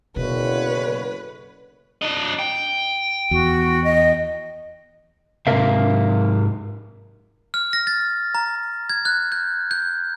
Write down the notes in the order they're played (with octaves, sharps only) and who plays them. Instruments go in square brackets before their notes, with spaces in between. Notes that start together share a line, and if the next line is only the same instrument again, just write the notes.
[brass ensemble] F#1 D3 C#5 [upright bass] B2 [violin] B4
[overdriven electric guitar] D4 D#5
G5
[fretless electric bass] E2 [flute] F#4
[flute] D#5
[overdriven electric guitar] G#2 C3 [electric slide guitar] A#4 E5 F5
[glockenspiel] F6
A#6
A6
A#5
G#6
F#6
G6
G6